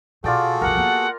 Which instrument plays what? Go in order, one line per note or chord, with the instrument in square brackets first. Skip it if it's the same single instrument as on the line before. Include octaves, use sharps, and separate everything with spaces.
[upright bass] B2 [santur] F4 D5 G5 [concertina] F#4 G#4 A4
[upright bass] C2 F2 [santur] A#4 [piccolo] F#5
[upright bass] A#3 B3